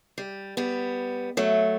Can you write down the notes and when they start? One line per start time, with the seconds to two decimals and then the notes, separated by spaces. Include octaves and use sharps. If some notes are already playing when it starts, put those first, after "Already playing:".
0.18 G3
0.57 G3 B3
1.37 F#3 A3